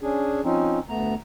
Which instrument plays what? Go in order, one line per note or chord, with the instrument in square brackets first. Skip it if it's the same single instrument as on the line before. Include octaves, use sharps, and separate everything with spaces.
[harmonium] C#4 D4 G#4
F3 C4 C#4 D#4
D2 A3 B3 A#5